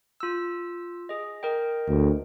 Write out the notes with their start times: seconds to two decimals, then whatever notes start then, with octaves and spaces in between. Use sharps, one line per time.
0.20 F4 E6
1.09 G#4 D#5
1.43 A#4 D#5 G5
1.89 D2